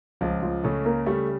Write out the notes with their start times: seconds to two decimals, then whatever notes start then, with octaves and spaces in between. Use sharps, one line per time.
0.21 C#2 F3 F4
0.43 F3 F4
0.64 C#3 A3 A4
0.85 A#3 A#4
1.06 G3 A3 A4